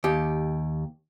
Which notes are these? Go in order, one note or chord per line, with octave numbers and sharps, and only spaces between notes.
D#2 G4